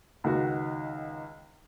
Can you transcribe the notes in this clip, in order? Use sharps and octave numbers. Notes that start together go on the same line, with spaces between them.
C#2 D#3 F#4 F#5